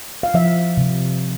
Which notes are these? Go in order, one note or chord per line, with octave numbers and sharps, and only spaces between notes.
F5
F3 E5
C3